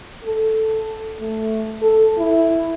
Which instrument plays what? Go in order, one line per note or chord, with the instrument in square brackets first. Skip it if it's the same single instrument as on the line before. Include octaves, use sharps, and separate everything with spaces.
[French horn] A4
A3
A4
E4